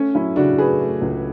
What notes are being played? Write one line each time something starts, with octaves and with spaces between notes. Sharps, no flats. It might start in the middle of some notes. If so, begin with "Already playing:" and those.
Already playing: A3 C#4
F#3 C#4 E4
C#3 D4 F#4
A3 G#4 B4
A3
C#2